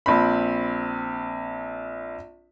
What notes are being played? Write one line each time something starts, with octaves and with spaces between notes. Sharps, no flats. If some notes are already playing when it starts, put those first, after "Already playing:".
A#1 C4 B5